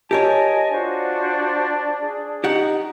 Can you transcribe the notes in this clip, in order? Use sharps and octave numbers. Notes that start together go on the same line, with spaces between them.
G4 A#4 C#5 D#5 G#5 A5
D4 F4 F#4 C5
G#4
D#4 G4 F#5